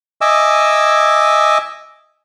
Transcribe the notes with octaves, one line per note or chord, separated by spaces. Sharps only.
D#5 E5 G#5 D6 E6